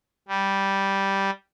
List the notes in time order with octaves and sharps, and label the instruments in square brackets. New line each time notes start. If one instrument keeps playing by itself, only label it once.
[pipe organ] G3